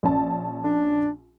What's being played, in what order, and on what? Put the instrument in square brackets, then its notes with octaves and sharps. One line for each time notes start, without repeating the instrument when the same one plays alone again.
[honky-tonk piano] A#1 C#4 A5
[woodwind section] D4